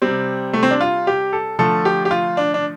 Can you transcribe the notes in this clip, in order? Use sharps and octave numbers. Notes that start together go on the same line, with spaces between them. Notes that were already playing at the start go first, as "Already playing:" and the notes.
C3 G3 C4
A3
C4
D4
F4
G4
A4
D3 F3 A3 A4
G4
G4
F4
D4
D4